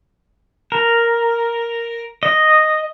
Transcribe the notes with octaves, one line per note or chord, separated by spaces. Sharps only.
A#4
D#5